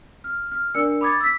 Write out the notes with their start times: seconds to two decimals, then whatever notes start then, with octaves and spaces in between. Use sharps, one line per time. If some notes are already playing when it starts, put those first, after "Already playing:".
0.24 F6
0.52 F6
0.75 D4 A#4 D5 E6 C#7
1.01 B5 D6 D#6 G#6 A6
1.20 E6 B6